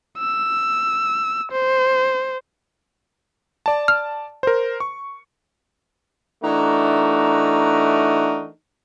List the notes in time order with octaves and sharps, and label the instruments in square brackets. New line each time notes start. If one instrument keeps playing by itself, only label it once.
[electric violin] E6
C5
[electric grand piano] D5 A5
[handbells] F6
[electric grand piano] A#4 C5
C#6
[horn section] E3 A3 D4 D#4 F#4 A#4